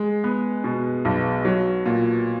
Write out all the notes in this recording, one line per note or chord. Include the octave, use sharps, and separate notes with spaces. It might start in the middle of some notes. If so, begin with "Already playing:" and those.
Already playing: G#3
B3
B2
B1
F#3
A#2